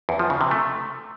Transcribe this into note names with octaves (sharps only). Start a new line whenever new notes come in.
E2
F3
C#3
C3
A3